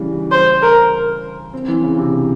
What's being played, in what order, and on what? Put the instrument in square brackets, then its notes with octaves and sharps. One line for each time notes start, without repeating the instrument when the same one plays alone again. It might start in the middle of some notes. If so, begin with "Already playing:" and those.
Already playing: [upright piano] C#3 E3 G3
[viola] C5
A#4
[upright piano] C4
E3
C#3
C3